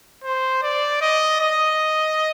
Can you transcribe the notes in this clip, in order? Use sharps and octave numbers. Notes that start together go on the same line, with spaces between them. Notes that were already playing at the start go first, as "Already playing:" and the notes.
C5
D5
D#5
D#5